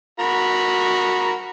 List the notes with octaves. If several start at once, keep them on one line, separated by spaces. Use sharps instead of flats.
F#4 A#4 B5